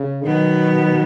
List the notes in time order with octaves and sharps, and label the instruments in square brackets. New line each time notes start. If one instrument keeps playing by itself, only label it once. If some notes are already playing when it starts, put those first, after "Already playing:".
Already playing: [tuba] C#3
[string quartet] B2 F#3 B3 [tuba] D#3